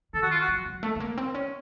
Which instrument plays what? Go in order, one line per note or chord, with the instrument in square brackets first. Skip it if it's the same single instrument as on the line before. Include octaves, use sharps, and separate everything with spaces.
[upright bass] D#3 [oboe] A4
[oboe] F#4
F4
F#4
[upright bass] F#3
F#3
A3
A3
A#3
C4
C#4